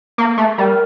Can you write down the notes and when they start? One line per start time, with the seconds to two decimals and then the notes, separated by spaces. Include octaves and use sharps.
0.18 A#3
0.37 A3
0.58 G3 A#4